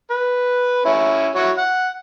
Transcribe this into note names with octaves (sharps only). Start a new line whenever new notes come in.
B4
C#4 E4
E4 F#4 C#5
F#5